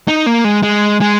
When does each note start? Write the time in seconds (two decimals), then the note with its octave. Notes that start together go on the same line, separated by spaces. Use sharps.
0.08 D#4
0.26 A#3
0.44 G#3
0.63 G#3
1.01 G#3